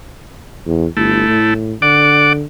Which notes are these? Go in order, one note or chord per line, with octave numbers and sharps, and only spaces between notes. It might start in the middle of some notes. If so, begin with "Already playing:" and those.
E2
G1 A3 E4
A2
D3 D5 F#5 D6